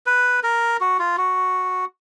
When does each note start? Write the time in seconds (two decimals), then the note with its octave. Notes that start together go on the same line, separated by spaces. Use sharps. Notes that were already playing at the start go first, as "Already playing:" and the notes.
0.06 B4
0.43 A#4
0.81 F#4
0.99 F4
1.18 F#4